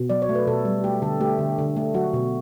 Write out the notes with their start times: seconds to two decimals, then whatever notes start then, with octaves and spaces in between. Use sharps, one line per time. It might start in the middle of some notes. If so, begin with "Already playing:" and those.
Already playing: B2
0.10 F#3 D5
0.22 C#5
0.29 A3
0.35 B4
0.47 B2 A4
0.65 G3
0.84 A3 G4
1.02 D3 A4
1.20 A3 G4
1.39 D3
1.58 D3
1.76 A3
1.94 F#3 F#4
2.14 B2